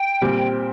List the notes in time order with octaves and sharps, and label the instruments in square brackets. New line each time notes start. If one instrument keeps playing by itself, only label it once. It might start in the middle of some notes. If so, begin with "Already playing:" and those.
Already playing: [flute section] G5
[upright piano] A#2 G3 C4 G4